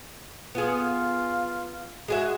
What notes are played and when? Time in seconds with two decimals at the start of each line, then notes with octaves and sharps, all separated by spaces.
0.55 B3 F4 G#4
2.08 G#3 F#4 G#4 E5